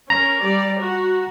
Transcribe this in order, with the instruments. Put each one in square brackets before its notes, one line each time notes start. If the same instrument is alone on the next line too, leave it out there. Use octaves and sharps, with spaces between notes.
[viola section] C#4 A#4 [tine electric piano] A#5
[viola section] G3 D5
F#4